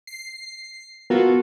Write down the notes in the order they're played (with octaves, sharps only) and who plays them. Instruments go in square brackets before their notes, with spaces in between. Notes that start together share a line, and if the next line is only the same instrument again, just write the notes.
[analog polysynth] C7
[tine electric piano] B3 A#4 [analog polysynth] F4 F#4 A4